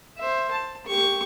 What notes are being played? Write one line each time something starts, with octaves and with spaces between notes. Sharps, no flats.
C5 E5
A5
G4 C#6